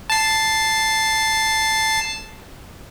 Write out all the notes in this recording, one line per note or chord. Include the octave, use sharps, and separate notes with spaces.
A5 C7